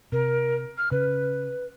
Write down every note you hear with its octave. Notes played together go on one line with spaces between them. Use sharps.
C3 A#4
F6
C#3 B4